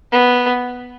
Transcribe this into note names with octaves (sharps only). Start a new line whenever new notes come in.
B3